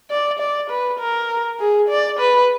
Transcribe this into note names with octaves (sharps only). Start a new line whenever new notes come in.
D5
D5
B4
A#4
G#4
D5
B4